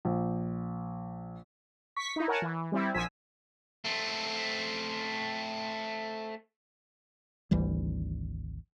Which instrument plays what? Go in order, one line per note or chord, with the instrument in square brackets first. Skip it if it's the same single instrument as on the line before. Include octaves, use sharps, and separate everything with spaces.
[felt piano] A#1
[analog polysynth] C#6 B6
D#4 E4
A#4 C#5 F#5 G#5 A5
E3
G3 C4 E4
A#1 F3 G#5 E6 B6
[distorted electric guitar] A3 C4
[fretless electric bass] G#1 D2 E3 G3